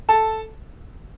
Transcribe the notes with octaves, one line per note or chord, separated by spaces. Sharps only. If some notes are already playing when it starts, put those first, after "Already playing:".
A4 A5